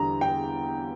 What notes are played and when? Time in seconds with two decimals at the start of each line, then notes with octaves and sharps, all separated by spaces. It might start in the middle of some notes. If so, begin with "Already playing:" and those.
Already playing: E2 D3 G3 A#5
0.21 G5